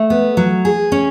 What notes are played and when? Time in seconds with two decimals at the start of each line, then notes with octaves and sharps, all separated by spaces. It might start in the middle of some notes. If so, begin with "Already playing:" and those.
Already playing: A3
0.10 B3
0.37 F#3
0.65 G#4
0.92 C#4